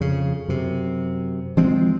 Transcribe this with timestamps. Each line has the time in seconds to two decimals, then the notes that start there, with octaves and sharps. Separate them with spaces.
0.01 F2 C#3
0.48 F#2 C3
1.57 E3 F3 G#3 C4